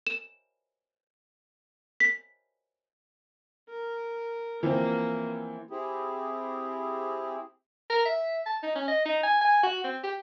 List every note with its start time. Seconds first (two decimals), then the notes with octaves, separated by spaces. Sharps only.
0.07 E7
2.00 B6
3.69 A#4
4.63 E3 F3 A#3 C4
5.71 C4 E4 G4 G#4
7.90 A#4
8.05 E5
8.46 A5
8.63 D#4
8.75 C#4
8.88 D#5
9.06 D#4
9.23 G#5
9.41 G#5
9.64 F#4
9.84 C4
10.03 G4